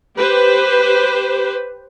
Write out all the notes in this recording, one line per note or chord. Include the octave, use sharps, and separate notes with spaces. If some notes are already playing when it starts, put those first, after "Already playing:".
G4 B4 C5